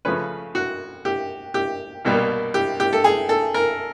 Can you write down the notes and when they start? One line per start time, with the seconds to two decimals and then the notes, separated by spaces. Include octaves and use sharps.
0.05 C#3 F3 A3 C#4 B4
0.55 F#4
1.05 G4
1.54 G4
2.05 C2 B2 G3 A#3
2.54 G4
2.80 G4
2.93 A4
3.04 G#4
3.29 A4
3.54 A#4